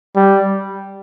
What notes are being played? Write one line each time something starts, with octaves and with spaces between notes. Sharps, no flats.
G3